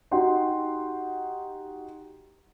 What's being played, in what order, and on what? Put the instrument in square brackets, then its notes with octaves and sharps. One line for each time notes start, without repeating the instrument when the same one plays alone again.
[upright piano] D#4 F#4 G4 F#5 G5 C6